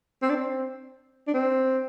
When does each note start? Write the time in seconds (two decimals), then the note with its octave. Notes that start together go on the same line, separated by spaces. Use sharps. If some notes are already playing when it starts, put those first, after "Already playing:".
0.22 C4
0.29 D4
0.36 C4
1.27 D4
1.34 C4